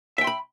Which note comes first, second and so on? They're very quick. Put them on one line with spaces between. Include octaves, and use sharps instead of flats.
E5 G5 C6 B5